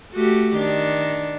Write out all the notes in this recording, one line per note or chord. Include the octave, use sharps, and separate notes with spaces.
A3 F#4 G4
D#3 D4